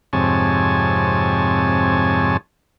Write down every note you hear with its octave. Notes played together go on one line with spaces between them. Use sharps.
F2 G#2 C3 C#5 G#5 A5